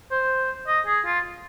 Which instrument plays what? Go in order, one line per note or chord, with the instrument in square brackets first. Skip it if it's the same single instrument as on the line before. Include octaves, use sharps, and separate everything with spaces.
[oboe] C5
D#5
G#4
F4